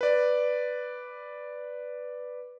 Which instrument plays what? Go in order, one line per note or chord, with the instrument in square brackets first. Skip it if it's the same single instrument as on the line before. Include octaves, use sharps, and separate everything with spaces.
[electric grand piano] B4 D5